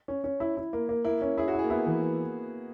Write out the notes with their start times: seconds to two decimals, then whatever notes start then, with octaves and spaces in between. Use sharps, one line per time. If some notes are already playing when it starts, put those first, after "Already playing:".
0.08 C#4
0.24 C#4
0.40 E4
0.57 E4
0.73 A#3
0.89 A#3
1.05 A#3 E4
1.22 C#4
1.38 E4 G#4
1.48 F#4
1.53 E4
1.59 G#4
1.64 A#3
1.70 B3 E4
1.86 E3